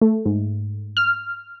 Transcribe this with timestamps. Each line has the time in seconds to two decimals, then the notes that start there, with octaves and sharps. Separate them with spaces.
0.01 A3
0.25 G#2
0.97 F6